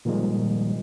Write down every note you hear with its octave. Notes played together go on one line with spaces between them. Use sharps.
A#2 D#3 F3 G3 G#3